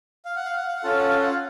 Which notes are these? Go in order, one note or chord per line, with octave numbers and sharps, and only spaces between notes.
F5
F#5
F5
F#5
F5
F#5
C#4 F4 A4 F5
F#5
F5
F#5
F5